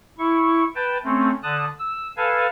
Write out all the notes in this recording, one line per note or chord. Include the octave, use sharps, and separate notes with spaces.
E4 C#6
B4 G5 A5
A3 C4 C#4
D3 A5 D#6 F#6
E6
A4 B4 F5 G#5 A5